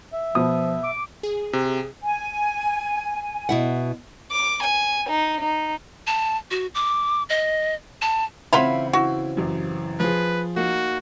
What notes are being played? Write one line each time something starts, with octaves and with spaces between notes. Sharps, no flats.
E5
B2 F3 D#6
D6
G#4
C3
G#5
B2 E4 F#5
D6
G#5
D#4
D#4
A5
F#4
D6
D#5
A5
C#3 E3 C4 E4 F4 F#5 B5
E4 F#4
A1 F#2
F3 G#4 B4
A#3 D#4 F#4